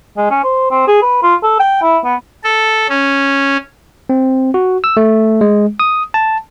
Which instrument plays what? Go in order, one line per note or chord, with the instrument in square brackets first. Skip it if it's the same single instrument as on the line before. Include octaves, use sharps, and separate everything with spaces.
[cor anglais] G#3
C#4
C5
C4
G#4
B4
F4
A4
G5
E4
B3
[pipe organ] A4
C#4
[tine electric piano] C4
F#4
E6
A3
G#3
D#6
A5